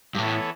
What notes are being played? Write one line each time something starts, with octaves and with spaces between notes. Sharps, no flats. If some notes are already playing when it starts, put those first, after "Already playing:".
G2
A2 E3 B3 E4 A4 C#5